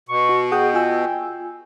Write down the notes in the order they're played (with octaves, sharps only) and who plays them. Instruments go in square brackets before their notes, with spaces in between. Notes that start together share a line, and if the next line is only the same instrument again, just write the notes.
[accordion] B2 [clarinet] C#6
[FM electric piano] F#4
[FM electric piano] G#4 F#5 D#6 [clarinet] G5
[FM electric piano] F4 G#5 E6